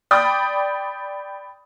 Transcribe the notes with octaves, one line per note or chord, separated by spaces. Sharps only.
D5 G5 B5 D#6